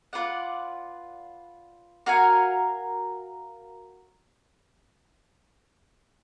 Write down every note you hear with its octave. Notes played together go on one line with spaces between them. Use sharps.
F4 B4 D5 F#5
F#4 A#4 F5 G#5